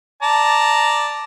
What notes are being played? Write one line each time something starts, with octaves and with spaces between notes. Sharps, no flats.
D5 A5 A#5